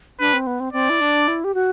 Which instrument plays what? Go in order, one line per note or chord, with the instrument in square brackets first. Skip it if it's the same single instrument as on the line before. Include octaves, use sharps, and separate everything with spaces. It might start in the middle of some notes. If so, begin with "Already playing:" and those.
[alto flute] D4 [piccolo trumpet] B4
[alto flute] C4
B3
C4
[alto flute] C4 [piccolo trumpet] D5
[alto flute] E4
D4
E4
G4
F#4